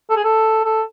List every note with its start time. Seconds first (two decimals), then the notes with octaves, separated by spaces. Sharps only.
0.10 A4
0.16 G#4
0.24 A4
0.65 A4